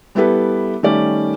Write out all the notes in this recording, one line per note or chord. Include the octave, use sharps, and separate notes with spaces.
G3 B3 E4 G4 A4 B4
D#3 G3 A3 C#4 G4 D5